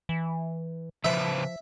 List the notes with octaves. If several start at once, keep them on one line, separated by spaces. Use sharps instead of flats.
E3
C#3 F3 B4 C5 E5